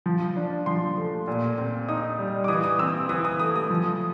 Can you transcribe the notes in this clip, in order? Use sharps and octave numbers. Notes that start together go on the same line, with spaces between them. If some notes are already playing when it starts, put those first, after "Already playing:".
F3
D4
F3 C6
A3
A#2
C4
D#4 D#6
G3
D6
E3 D#6
D#6
C4 E6
E3 D#6
D#6
A3 D#6
D#6
F3